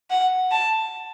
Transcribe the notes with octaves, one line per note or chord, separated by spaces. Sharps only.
F#5
A5